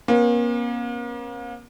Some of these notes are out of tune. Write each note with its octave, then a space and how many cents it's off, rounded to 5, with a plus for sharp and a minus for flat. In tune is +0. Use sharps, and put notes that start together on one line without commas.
A#3 +40 C#4 -45